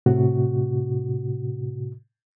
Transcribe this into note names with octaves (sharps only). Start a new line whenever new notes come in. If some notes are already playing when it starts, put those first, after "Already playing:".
A2 C3 F#4